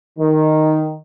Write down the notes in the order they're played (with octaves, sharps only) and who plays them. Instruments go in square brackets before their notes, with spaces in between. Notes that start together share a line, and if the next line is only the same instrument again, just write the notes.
[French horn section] D#3